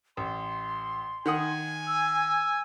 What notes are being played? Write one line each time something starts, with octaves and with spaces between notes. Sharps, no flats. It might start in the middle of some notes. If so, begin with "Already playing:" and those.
A1 C6
D#3 F#5 G#5 D#6
E6